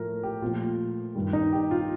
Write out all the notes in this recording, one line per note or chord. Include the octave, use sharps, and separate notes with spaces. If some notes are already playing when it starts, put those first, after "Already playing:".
Already playing: A2 F3 A3 A#4
G4
A#2 F3 A3 F4
G2 D#3 G3
D#4
G4
F4